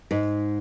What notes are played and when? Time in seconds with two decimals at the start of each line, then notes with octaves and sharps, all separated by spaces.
0.11 G#2